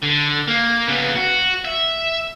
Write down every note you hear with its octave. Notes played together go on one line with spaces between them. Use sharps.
D3
A#3
C#3 B3
F#4
E5